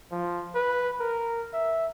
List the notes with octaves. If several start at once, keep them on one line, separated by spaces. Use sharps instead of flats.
F3
B4
A#4
E5